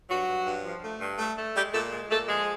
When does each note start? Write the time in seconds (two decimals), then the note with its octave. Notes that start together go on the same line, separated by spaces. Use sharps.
0.09 G2 F#3 F#4
0.28 G2
0.46 G2
0.65 F3
0.83 A3
1.01 G2
1.19 A3
1.38 A3
1.56 G3 G#3 G4
1.74 A#2 A3 A4
1.92 G#3
2.10 A#2 A3 A4
2.28 F3 G#3 G#4